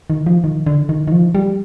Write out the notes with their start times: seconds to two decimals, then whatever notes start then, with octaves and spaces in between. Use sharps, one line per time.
0.10 D#3
0.26 F3
0.44 D#3
0.67 D3
0.89 D#3
1.08 D#3
1.12 F3
1.35 G3